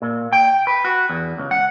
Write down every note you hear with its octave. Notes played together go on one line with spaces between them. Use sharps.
A#2
G5
B4
F#4
E2
C#2
F#5